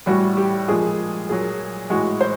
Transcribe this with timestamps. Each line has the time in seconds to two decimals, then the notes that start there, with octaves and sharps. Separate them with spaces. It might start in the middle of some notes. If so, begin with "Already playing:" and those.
0.06 A2 E3 G3 F#4
0.37 G4
0.68 A#2 F3 G#3 G#4
1.29 A#2 F#3 G#4
1.90 A2 E3 G#3 F#4
2.21 C5